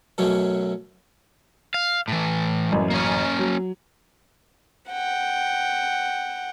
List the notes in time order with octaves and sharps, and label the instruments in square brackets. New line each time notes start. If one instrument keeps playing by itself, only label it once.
[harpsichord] F#2 B2 F#3 A3 C#4
[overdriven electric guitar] F5
A2 E3
[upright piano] A1 F#2
[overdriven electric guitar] A#3 C#4
[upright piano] F#3
[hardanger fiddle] F#5 G5